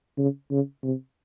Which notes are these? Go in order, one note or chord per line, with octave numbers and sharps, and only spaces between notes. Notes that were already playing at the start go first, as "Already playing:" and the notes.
C#3
C#3
C3